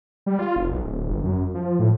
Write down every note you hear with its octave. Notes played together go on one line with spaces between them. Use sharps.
G3
F4
F1
B1
D1
G1
F#2
F3
A2